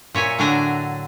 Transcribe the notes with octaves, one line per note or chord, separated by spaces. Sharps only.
A#2 C#5 E5 G#5
A2 D3 F#3 D4 G#5 A#5